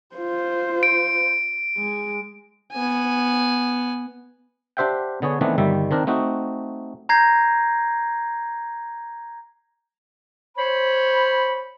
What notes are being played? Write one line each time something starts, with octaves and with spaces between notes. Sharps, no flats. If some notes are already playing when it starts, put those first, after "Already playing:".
F4 C5
D7
G#3
B3 G#5
D4 G4 C5 E5 F#5 G5
D3 B3 G#4 C#5
D#3 E3 A3 B3 C4 D4
G1 D#3 G3 E5
D#3 C4 D4 A#4
A3 C4 D#4 F#4
A#5 G6 G#6 A#6 C7
C5 C#5 B5